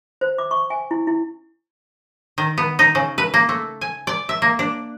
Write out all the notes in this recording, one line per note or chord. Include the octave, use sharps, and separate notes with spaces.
C5
D6
C#6
G#5
E4
E4
D#3
B3
D#4
C#3
B4
A#3
A3
G#5
D5
E5
A#3
D4